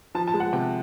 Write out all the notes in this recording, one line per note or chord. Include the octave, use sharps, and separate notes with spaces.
F3 A5
A5
G#3
F#5
C3 G5